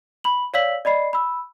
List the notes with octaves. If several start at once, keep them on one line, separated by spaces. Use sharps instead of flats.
B5 F#7
C#5 D5 F5 E6 B6 F#7
D5 D#5 B5 C7
B5 E6